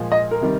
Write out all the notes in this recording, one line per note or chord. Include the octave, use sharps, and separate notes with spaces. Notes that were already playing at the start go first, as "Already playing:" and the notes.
Already playing: A#2 F3 G#3
D#5
A#4
C3 D#3 G3